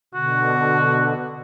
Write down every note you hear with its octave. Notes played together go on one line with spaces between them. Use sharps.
B2 D3 F#4